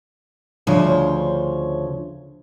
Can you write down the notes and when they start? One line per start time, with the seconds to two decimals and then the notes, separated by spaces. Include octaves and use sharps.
0.67 D2 C#3 F3 C5 C#5